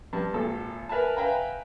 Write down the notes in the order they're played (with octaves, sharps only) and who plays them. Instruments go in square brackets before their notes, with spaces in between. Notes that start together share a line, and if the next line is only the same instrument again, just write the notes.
[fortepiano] G2 A5
G#1 A#2 A4
A#4 B4 E5 G#5 A5
B4 E5 F5 G5 G#5 A#5